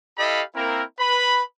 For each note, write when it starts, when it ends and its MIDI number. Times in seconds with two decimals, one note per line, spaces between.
0.18 0.43 64
0.18 0.43 67
0.18 0.43 69
0.18 0.43 75
0.18 0.43 77
0.18 0.43 83
0.55 0.82 58
0.55 0.82 60
0.55 0.82 64
0.55 0.82 70
0.99 1.42 71
0.99 1.42 83